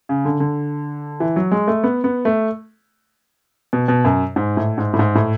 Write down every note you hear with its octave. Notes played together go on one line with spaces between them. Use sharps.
C#3
D3
D3
E3
F#3
G#3
A3
B3
B3
A3
B2
B2
F#2
G#2
A2
G#2
A2
G#2
A2